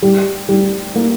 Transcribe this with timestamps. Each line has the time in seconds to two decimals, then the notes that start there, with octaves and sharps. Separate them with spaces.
0.02 G3
0.49 G3
0.96 A#3